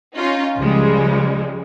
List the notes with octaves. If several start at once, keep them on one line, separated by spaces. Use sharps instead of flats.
C#4 D#4 F4
C#2 C#3 F3 G3 G#3